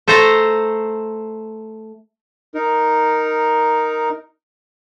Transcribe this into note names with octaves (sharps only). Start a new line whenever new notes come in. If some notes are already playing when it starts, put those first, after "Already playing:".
A3 A4 C5 A5 A#5
D#4 A#4